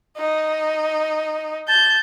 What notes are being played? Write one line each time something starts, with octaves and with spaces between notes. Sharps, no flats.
D#4
A5 G6